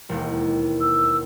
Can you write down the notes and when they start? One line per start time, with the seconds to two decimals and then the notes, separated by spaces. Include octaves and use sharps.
0.09 E1 D#2
0.80 E6